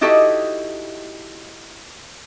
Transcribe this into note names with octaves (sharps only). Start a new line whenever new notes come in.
D#4 E4 F#4 G4 A4 D#5